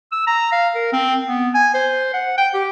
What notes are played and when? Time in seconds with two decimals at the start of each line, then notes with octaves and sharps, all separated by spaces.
0.12 E6
0.27 A#5
0.52 F5
0.75 A#4
0.93 C4
1.28 B3
1.54 G#5
1.74 C5
2.14 F#5
2.38 G5
2.54 G4